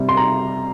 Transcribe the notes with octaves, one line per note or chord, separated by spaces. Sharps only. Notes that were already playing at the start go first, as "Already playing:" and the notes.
Already playing: C3 G3
C6
A#5